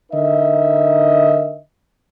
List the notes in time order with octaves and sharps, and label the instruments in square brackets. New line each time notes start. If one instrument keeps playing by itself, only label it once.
[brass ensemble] D3 D#4 A#4 D#5 E5